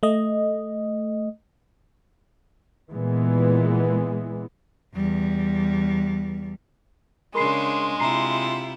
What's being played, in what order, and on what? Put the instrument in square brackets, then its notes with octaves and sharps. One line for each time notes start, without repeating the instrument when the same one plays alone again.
[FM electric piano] A3 D#5
[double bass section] A#2 E3 G#3 B3
[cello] E2 G3
[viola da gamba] C#3 D4 G#4 [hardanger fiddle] G#3 [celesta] A#4 B5 C7 [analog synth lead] C6
[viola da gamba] C3 E4 F4 [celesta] A#5 C7